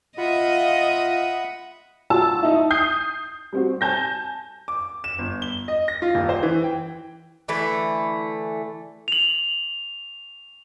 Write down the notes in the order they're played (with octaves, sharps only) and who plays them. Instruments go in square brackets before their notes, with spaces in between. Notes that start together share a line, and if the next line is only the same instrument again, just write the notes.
[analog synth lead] F4 [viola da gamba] D#5 [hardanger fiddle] E5 D#6 [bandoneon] F#5 B5
[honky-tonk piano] F4 F#4 A5 E6
D#4 E4
D#6 G6 C7
G3 C4 F#4
G#5 A5 G6 A#6
[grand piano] D6
E7
G1
G7
D#5
A#6
F4
D#1
C5
E3
G5
[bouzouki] D3 E3 A3
[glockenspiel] F7 F#7